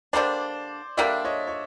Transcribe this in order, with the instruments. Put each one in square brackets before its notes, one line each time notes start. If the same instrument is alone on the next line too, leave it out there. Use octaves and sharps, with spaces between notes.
[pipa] D3 G3 A#3 D4 [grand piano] C5 D5
[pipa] D3 G3 A#3 D4 [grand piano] D5 E5
[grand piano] C#5 D#5
C#5